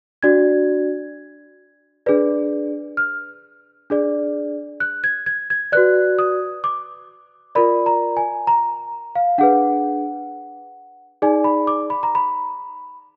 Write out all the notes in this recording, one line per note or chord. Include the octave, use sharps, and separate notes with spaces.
D4 F#4 D5 G#6
D4 G#4 B4 D5
F6
D4 G#4 D5
F#6
G#6
G#6
G#6
F#4 B4 D5 F#6
D#6
D6
F4 A#4 D5 B5
A#5
G#5
A#5
F5
D4 G#4 B4 F#5
D#4 G#4 D5 G#5
B5
D6
B5
A#5
B5